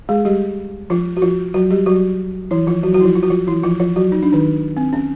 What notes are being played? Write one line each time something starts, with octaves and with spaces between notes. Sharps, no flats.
G#3 G#4
G3 G4
F3 F4
F#4
F3 F4
F#3 F#4
G3 G4
F#3 F#4
E3 E4
F3 F4
F#3 F#4
F#3 F#4
E4
F3 F4
F4
F#4
F3 F4
E3 E4
F3 F4
F3 F4
F#3 F#4
D#4
D4
D#3 D#4
C4
C#4